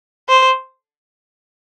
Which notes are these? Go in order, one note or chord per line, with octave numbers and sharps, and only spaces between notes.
C5